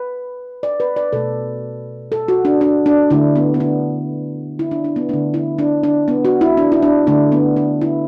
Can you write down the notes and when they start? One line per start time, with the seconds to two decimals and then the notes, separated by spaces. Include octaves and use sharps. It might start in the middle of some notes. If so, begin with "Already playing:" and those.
Already playing: B4
0.63 D5
0.80 B4
0.96 D5
1.13 B2 A3 A4
2.12 A4
2.28 F#4
2.45 D4
2.61 D4
2.86 D4
3.10 D3 A3 E4
3.36 B3
3.54 B3
3.60 D4
4.59 E4
4.71 D4
4.84 D4
4.96 B3
5.09 D3 A3 D4
5.34 E4
5.59 D4
5.83 D4
6.08 B3
6.25 F#4
6.41 E4
6.57 D4
6.72 E4
6.83 D4
7.07 D3 A3 D4
7.32 B3
7.56 D4
7.82 E4